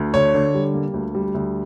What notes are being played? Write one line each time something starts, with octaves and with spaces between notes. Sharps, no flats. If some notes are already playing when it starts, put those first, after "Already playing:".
Already playing: D2
D3 C#5
D3
G3
A#3
D2
G3
D2